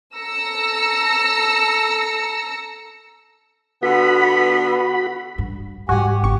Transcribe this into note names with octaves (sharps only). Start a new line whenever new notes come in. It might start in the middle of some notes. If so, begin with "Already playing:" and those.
A4 A#5 E6 A#6 C#7
D3 B3 F#4 B5
G2
G#2 G3 F#4 G4 F#5 G#5
G4
G1 C#6